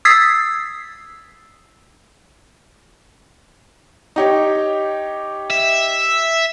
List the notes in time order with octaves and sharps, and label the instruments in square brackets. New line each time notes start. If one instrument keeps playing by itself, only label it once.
[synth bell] D#6 E6 G#6 A6 B6 C7
[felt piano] D#4 G4 C#5
[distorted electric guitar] E5